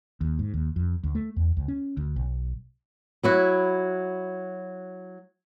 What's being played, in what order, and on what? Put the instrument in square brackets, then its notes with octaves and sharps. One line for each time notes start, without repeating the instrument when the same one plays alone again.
[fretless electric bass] D#2
G#2
D#2
F2
D2
A3
E2
C#2
C#4
D2
B1
[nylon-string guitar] F#3 E4 F#4